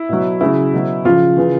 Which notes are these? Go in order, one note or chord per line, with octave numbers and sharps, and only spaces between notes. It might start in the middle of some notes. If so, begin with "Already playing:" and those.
Already playing: E4
B2 F#3
C#3 F#3 E4
B2 F#3
C#3 F3 F4
C#3 E3